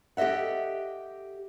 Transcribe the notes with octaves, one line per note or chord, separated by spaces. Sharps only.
G4 A4 D#5 E5 F#5